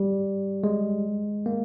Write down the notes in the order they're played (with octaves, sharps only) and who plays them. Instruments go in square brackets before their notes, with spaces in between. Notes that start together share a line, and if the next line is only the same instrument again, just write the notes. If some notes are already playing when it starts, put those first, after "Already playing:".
Already playing: [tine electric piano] G3
G#3
A#3